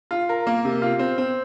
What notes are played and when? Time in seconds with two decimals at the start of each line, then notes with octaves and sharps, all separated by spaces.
0.11 F4
0.29 A#4
0.47 A#3
0.65 C3
0.82 F4
0.99 C4
1.18 C4